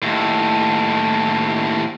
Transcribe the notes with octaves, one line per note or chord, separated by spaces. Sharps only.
D#2 A2